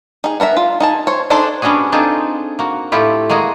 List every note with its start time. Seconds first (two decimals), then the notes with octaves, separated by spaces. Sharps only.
0.24 D#4 G#4
0.40 B3 A#4 D5 E5
0.57 F4
0.80 D#4 G#4 A5
1.07 C5 C#5
1.30 D4 D#4 G#4 A4 C5
1.62 G3 B3 C#4 D4 F#4 G#4
1.92 C4 D4 D#4 F4 G#4 A4
2.59 A#3 F#4
2.92 A2 A3 E4 F4 G4
3.30 G#3 A#3 F#4 G#4